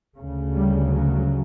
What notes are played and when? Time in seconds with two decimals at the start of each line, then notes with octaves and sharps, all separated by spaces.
0.17 D2 C#3
0.53 G3
0.89 F#3